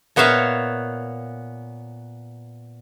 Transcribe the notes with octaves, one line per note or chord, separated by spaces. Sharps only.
A#2 B3 C#5 E5 F5